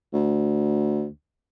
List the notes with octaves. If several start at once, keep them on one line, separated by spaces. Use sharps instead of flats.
D2